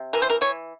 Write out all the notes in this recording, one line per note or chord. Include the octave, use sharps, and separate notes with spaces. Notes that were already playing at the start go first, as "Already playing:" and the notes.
Already playing: C3
E3 A#4
C5
A#4
E3 C#5